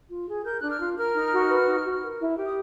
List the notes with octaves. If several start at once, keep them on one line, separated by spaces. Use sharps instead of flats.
F4
G#4
A#4 G6
D4 F#6
F6
F4
A#4 F6
D#4
F#4
B4
D#4
F#4
A#4
E4
G4
D#6